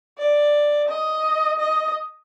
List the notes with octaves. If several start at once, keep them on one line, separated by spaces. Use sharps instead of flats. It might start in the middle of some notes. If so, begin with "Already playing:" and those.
D5
D#5
D#5